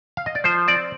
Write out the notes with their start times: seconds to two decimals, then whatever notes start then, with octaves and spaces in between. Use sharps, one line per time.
0.17 F5
0.26 D#5
0.35 D5
0.44 F3 C5
0.67 C4 D5